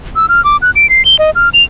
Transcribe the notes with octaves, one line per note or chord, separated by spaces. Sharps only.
E6
F6
D6
F#6
D7
C7
G7
D#5
F6
F7